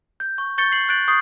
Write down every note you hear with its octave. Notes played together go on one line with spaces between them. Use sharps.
G6
C#6
C#6 G6 A6 C#7 G7
C7 F#7
F#6 G6 A6 D7 F#7
C#6 D#6 G6 C7